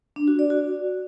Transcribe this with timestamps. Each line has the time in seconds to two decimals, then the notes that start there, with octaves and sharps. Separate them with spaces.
0.16 D4
0.28 F#4
0.39 D5
0.50 F#4